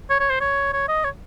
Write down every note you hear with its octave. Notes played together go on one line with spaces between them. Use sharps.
C#5
C#5
C5
C#5
C#5
D#5
C#5